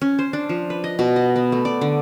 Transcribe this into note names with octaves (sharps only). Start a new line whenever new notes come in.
C#4
C5
D4
F3
B4
D#5
B2
D#5
B3
A3
D5
D3